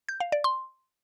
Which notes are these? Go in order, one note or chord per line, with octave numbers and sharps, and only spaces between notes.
G6
F5
D5
C6